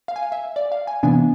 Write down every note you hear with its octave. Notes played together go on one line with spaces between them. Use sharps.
F5
G#5
F5
E5
D5
F5
G#5
C3 E3 B3 D4 G#5